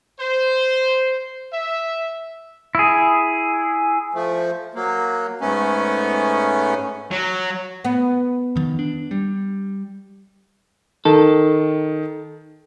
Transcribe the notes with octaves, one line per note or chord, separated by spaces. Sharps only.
C5
E5
E4 G#4
F3 A3
F#3 A#3
G#2 A3 B3 C#4
F#3
B3
F2 D#3
D4
G3
D#3 A4